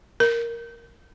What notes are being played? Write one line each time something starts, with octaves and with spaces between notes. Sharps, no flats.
A#4